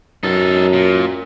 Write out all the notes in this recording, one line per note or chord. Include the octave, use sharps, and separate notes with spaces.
F#2 D#4 A4
A#2